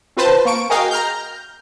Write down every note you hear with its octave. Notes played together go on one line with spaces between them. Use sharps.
C4 F4 B4 C5 A5
A#3 C#6 D7
F#4 G#4 A#4 D#5 F5 G5
A#5 F6 G6